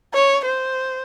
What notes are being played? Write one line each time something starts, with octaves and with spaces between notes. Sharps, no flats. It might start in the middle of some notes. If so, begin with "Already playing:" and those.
C#5
C5